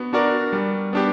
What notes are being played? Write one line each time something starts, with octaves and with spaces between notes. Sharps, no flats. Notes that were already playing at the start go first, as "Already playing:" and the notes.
Already playing: B3 D4 F#4
D4 F#4 A#4 D5
G3
B3 D4 G4